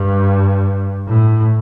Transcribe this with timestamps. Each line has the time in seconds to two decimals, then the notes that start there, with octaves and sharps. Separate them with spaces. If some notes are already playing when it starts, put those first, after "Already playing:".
Already playing: G2
1.07 A2